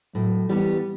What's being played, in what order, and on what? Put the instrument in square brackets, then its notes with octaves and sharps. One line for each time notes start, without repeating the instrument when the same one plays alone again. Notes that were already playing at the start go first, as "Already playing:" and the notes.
[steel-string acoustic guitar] A2 [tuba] F#3
[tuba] E3 [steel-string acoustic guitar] G3 B3